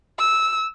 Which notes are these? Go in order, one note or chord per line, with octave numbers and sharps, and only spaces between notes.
E6